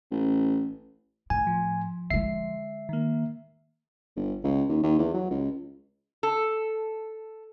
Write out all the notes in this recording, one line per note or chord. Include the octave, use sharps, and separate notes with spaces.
A1
A2 G#5
F3
D3 G#3 E5 C7
D#3 A#3
G1
C#2
D#2
D#2
E2
F#3
C#2
A4